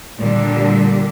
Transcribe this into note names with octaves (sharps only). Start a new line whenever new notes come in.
A#2 D3 G3 D4